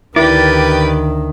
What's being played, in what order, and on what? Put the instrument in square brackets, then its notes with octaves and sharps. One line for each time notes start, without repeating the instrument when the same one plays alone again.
[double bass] D2 D#3 [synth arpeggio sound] E4 [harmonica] G4 B4 [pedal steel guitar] D5